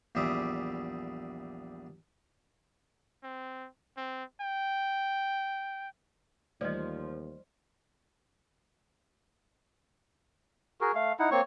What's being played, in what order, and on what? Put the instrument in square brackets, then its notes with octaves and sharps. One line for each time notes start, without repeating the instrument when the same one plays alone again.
[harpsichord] A#1 E2 G3 G#4 E5 D6
[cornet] C4
C4
G5
[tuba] D#2 [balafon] E3 G3 A3 [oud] F3 [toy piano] D5 D#5
[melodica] F#4 G#4 A#4
A3 F5
D#4 E4 F#5
A#3 C4 C#5 C#6